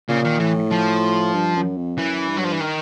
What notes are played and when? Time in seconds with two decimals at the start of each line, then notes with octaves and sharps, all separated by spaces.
0.09 A#2 C#3
0.24 D#3
0.40 A2 E3
0.71 F3
1.34 G2
1.56 F#2
1.77 F2
1.97 F#2 E3
2.29 G2
2.37 F#3
2.44 F3
2.52 E3
2.60 D#3